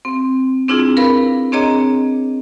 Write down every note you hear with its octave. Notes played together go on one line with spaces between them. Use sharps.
C4
C4 D4 E4 F4 G#4
A#4 B4 F5 B5
C4 D4 G#4 C#5 D#5 A#5